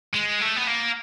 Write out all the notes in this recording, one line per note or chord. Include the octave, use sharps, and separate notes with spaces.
G#3
A3
B3
A#3